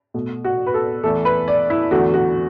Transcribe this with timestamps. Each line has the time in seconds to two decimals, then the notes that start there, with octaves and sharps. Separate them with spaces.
0.14 B2 A3
0.44 F#4
0.66 B4
0.74 A4
1.03 E2 E3 A3 A4
1.25 B4
1.48 D5
1.70 E4
1.91 E2 D3 A3 F#4
2.14 F#4